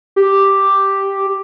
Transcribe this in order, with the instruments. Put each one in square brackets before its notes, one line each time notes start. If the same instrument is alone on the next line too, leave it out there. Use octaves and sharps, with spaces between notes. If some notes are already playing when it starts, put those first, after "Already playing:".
[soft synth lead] G4